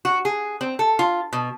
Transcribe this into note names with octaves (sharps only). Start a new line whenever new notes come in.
F#4
G#4
C4
A4
F4
B2